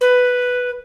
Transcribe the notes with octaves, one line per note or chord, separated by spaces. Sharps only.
B4